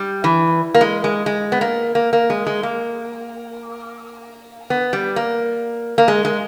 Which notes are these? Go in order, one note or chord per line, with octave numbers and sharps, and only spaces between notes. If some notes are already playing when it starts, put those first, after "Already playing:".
Already playing: G3
E3
A#3
G#3
G#3
G#3
B3
A#3
A#3
A#3
G#3
G#3
A#3
B3
G3
A#3
A#3
G#3
G#3